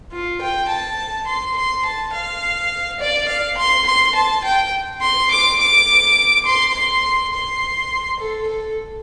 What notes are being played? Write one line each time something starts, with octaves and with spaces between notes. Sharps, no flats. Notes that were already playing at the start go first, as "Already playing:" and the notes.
F4
G5
A5
C6
C6
A5
F5
D5
F5
C6
C6
A5
G5
C6
D6
D6
C6
C6
C6
A4
A4